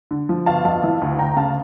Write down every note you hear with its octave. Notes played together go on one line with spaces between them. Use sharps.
D3
F3
G1 F5 A5
F2 F5 A5
E3
D2
D2 G5 A#5
C#3 F5 A5